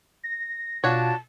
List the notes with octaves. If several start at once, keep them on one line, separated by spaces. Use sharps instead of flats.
A#6
B2 D4 F4 F#4 C#5 A5